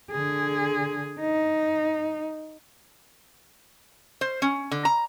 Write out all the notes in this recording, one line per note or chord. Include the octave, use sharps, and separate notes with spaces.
D3 G#4
D#4
C5
C#4
D3
A#5